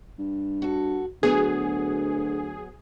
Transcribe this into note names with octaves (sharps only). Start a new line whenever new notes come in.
G2
F#4 A4
D2 F#3 B3 G#4